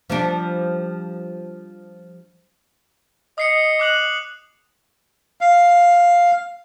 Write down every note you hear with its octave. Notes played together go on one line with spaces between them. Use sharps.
F3 G3 D4
D#5 D#6 C7 C#7
D6 F#6 F#7
F5